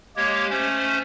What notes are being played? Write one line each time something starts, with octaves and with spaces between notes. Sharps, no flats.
G#3 A#3 G4 C#5
A3 C#4 C5